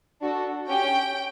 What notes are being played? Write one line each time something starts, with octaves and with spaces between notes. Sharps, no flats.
D4 F#4 A4
C#4 G4 G5